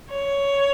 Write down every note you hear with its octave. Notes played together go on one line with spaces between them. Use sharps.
C#5